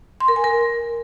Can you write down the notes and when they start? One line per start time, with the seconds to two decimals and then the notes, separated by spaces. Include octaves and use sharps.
0.20 C6
0.28 A#4
0.36 G#5
0.44 A#4